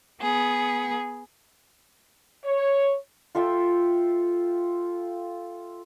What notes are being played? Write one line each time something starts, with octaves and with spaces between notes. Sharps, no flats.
B3 G#4
C#5
F4 A4 E5 G5